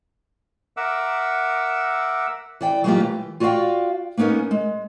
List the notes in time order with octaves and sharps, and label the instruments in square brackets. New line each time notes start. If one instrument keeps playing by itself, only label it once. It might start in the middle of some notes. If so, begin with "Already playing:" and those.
[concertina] A#4 E5 F#5 D6 E6
[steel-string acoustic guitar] E3 D5 G5
F#3 G#3 A#3 D#4 F4 G4
E3
F4 F#4 D5 E5 F5 G5
A#3 B3 C#4 D#4 A#4
G#3